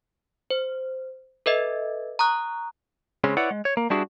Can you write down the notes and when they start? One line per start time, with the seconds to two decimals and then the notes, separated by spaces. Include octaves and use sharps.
0.50 C5
1.46 A4 B4 D#5 E5
2.19 A#5 C#6 D#6 F#6
3.24 C#3 G#3 C4 C#4
3.37 E4 B4 C#5 D5 F#5
3.51 G#3
3.65 C#5
3.77 A#3
3.90 G3 B3 D4 E4 F#4 G#4